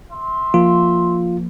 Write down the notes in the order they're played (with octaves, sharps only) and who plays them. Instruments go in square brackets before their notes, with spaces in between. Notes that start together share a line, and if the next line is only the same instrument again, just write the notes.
[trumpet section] E5 C6
[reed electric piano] F3 A#3 [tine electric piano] F4